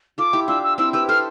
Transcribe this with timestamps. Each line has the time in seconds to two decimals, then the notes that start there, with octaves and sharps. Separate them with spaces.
0.18 F4 A4 D6
0.33 E4 G4
0.48 D4 F4 E6
0.63 E6
0.78 C4 E4 E6
0.93 G4 B4 E6
1.08 A4 C5 F6